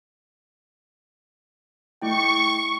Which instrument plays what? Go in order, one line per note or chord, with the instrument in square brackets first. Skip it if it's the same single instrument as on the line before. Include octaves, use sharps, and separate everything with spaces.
[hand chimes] A3 E4 G5 [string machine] C#6